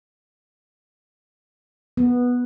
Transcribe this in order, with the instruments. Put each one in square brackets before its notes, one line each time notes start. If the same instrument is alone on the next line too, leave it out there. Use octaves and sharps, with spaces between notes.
[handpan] B3